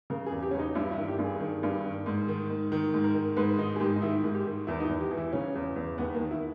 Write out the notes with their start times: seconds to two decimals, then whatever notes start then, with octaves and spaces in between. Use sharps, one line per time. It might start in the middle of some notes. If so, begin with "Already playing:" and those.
0.10 C#3 A#4
0.26 G#4
0.32 E2
0.43 G4
0.51 E2 C#4
0.59 D#4
0.75 G2 E4
0.91 E4
0.98 D#3
1.08 G4
1.19 G2
1.24 G#4
1.40 D#3
1.63 G2
1.84 D#3
2.06 G#2
2.28 D#3
2.50 G#2
2.72 D#3 A#4
2.94 G#2
3.04 A#4
3.14 D#3
3.37 G#2 B4
3.58 D#3 D#4
3.76 G#4
3.80 G#2 G4
3.96 D#4
4.02 D#3 E4
4.24 G#2
4.35 G4
4.46 D#3
4.67 E2 E4
4.80 D#4
4.84 E4
4.89 E2
5.00 G4
5.11 E3
5.17 E4
5.33 C#3 C#4
5.55 E2
5.76 E2
5.98 D#2 B3
6.14 A#3
6.20 D#3
6.31 E4